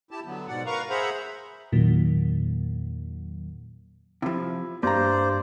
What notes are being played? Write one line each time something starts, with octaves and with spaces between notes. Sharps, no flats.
E4 G4 A5
D3 F#3 B3
G#2 B2 D5 F#5
A#4 B4 F5 A#5 C#6
G#4 C5 E5 F#5 A#5 B5
E2 A#2 D#3 F#3
C3 F3 E4
G2 A#3 C5 D5 A#5